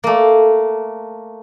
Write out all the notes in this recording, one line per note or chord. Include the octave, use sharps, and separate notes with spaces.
A3 A#3